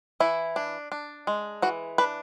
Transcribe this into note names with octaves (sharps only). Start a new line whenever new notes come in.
E3 E4
D4
D4
G#3
E3 F#4
D4 B4